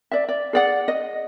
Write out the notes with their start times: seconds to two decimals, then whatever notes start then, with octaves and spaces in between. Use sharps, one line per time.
0.11 D5 E5
0.29 D5
0.53 G#4 D5 F#5
0.88 D#5